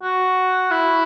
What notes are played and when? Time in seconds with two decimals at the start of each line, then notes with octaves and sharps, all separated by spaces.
0.03 F#4
0.71 E4